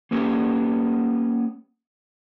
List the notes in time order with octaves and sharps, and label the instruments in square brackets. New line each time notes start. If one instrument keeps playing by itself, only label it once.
[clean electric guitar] A#3 B3 C#4 G4